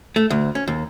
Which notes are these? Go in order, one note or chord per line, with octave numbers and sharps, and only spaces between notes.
A3
D2
C#4
D#2